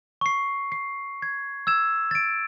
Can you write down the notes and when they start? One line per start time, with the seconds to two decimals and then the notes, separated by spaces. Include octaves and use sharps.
0.21 C#6 C7
0.72 C7
1.22 G#6
1.67 E6 G#6 E7
2.11 A6 D7